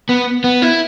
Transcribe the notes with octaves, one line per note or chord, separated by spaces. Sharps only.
B3
B3
E4